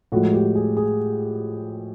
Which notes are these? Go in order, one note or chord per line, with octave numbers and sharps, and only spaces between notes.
A2 F3 G#3 F#4
G4
G#4
G#4